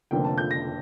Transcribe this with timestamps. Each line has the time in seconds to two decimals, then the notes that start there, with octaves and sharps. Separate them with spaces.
0.11 F1 F2 D3 F3 A#3 G5
0.25 A5
0.38 G6
0.51 A#6